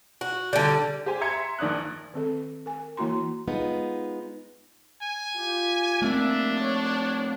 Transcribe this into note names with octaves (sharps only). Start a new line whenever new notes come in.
F#4
D3 G3
G4 C5 G#5
E5 A#5 C6 G#6 C#7
A#1 D#3 D5 D#6 F#6
D#3 C4 A4
A#4 G#5
E3 A#3 E4 F#4 A#5 C6
G#3 B3 D#4 F4
G#5
F4 G4
A3 A#3 C4 D4 E5
C#5